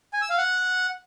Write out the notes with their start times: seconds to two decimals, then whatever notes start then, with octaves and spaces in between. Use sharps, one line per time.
0.13 G#5
0.22 E6
0.30 F5
0.38 F#5